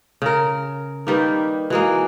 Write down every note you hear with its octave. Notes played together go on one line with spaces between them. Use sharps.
C#3 A#4
D#3 G3 A#3 D#4 B4
E3 G#3 A#3 F#4